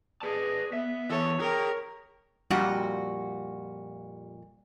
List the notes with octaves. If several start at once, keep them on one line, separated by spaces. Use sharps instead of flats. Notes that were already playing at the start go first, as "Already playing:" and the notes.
G#4 B4 D5 A5
B3 E5
E2 E3 A4 C#5
G#4 A#4 G5
F2 A#2 G3 F#4